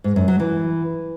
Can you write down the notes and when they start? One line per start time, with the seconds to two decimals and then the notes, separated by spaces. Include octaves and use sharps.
0.04 G#2
0.16 F#2
0.28 F#3
0.40 E3